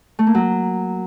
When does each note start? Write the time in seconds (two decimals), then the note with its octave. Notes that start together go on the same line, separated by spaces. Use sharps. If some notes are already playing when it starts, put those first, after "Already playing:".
0.19 A3
0.27 A#3
0.35 F#3